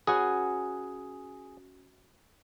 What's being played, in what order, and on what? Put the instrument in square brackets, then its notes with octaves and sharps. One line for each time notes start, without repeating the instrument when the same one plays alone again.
[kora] C#4 F#4 B4 [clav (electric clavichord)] G#4